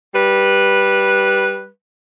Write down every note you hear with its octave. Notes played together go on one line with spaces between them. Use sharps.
G3 B4